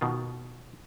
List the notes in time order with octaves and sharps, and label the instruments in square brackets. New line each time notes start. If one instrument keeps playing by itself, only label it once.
[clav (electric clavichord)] B2 D#3 F4